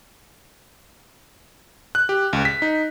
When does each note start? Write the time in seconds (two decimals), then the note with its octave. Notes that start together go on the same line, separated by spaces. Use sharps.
1.95 F#6
2.09 G4
2.33 C#2
2.45 B6
2.62 D#4